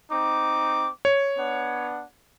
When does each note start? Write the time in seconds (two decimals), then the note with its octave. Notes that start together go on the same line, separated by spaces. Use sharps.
0.11 C4 D#4 D6
1.05 C#5
1.36 B3 D4 F#5